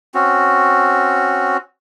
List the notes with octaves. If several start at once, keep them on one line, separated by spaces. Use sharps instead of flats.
C4 C#4 F#4